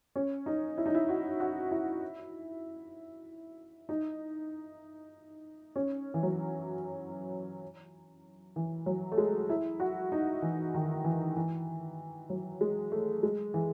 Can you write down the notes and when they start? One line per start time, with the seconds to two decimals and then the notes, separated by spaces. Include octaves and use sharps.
0.16 C#4
0.46 D#4
0.78 E4
0.86 D#4
0.95 E4
1.09 F#4
1.40 F#4
1.71 E4
3.89 D#4
5.76 C#4
6.14 E3
6.23 F#3
8.56 E3
8.86 F#3
9.12 A3
9.18 G#3
9.50 E4
9.80 F#4
10.12 D#4
10.42 E3
10.74 D#3
11.04 E3
11.36 E3
12.30 F#3
12.61 G#3
12.92 A3
13.23 G#3
13.54 E3